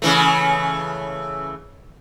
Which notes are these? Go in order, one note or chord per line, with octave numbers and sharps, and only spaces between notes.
C#3 E3 A3